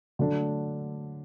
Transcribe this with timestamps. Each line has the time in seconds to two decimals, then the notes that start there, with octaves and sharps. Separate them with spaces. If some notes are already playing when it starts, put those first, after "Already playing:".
0.19 D3 F#3 A3 D4 A4